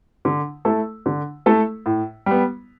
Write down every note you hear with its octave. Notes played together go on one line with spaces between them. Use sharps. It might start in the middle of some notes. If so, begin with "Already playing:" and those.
D3
A3 E4 A4
D3
A3 E4 A4
A2
G3 B3